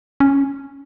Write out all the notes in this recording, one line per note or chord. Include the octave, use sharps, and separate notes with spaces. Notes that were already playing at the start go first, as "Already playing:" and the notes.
C#4